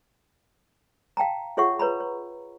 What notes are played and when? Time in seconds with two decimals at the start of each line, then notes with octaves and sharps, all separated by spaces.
1.17 F5 G5 A5 A#5
1.57 F4 G#4 C#5 E5 F#5 C#6
1.79 B4 C#5 A#5 B5
2.00 C#5